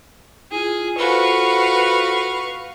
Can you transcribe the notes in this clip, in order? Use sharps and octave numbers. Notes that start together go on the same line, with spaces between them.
E4 F4 G#4
F4 F#4 A4 B4 C5 F5 C#6